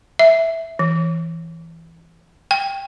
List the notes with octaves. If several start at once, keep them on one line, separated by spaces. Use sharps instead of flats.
E5
E3
G5